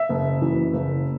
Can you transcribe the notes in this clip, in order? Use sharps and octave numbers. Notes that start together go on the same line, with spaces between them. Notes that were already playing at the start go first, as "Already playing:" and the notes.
Already playing: E5
F#1
F#2 E3
F#1